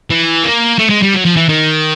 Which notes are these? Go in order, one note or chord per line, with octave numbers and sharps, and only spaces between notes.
E3
A#3
A3
G#3
G3
F#3
F3
E3
D#3